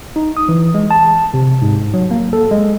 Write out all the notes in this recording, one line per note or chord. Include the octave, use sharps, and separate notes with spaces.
D#4
D#6
E3
G#3
A5
C3
G#2
F#3
A#3
A4
G#3